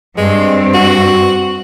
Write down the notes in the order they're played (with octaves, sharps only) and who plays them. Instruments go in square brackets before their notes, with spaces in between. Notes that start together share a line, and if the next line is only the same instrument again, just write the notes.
[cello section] G2 C4 [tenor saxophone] G#3
[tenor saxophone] F#4